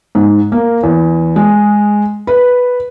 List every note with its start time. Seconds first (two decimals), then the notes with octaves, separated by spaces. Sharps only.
0.15 G#2
0.52 A#3
0.83 E2
1.36 G#3
2.27 B4